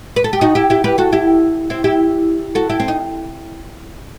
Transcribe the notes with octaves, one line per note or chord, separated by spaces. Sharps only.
B4
A4
G4
D#4 F#4
E4 G4
E4 G4
G4 B4
F#4 A4
E4 G4
C4 E4
E4 G4
F#4 A4
E4 G4
C4
D#4